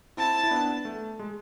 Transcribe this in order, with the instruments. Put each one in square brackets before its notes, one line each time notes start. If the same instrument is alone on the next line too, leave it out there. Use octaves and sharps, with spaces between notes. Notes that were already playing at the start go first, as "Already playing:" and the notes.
[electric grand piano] C4 E4 [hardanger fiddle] A5
[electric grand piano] E4
B3 D4
A3
G#3